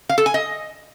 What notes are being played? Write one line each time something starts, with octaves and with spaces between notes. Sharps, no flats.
F5
A4
G#5
D#5